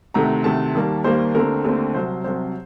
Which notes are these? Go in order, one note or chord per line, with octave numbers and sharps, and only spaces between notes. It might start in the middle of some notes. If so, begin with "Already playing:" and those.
D2 C3 D#3 A3 A#5
D2 C3 D#3 A3 A5
D#2 D#3 G3 A#3
D#2 D#3 G3 A#3 C5
D#2 D3 A3 C4 A#4
D#2 D3 A3 C4
C2 C3 F#3 C5
C2 C3 F#3 C5